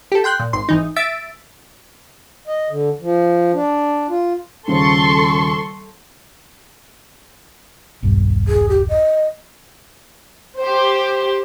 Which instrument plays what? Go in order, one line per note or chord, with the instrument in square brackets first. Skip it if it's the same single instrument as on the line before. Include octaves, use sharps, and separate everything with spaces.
[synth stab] G4 A4
G5 C6 F#6 G6
A#2
G#1 C6
G#1 E3 D#4
E5 E6 A6 B6 D7
[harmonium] D#5
D3
F3
D4
F4
[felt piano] D#1 C#3 C5 [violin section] A4 C6 C#6
[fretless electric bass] D#1 B1 G2
[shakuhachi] G#4
G4
D#5
[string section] G4 C5